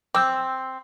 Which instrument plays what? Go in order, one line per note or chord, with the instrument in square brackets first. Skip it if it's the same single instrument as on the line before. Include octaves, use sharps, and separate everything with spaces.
[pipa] C4 [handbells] D6 E6 G6